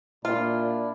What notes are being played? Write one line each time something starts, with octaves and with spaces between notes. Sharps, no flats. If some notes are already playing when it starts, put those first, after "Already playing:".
A#2 D4 E4 F4 D5